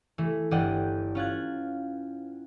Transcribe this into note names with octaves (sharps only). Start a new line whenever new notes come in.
E3 A3
G1 E3 D5 D#5 F#5 G5
C#4 F4 F#6 G#6